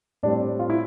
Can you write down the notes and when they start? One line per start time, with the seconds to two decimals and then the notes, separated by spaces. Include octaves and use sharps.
0.23 A2 G3 C4 D4
0.60 F4
0.70 E4